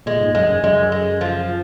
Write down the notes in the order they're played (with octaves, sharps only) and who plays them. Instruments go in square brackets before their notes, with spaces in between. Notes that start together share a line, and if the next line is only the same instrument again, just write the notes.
[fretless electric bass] A#2 [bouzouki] G#3
[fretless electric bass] G#2
[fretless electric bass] F#2 [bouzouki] G#3
[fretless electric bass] F#2
[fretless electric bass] F#2 [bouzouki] G#3
[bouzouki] G#3
F3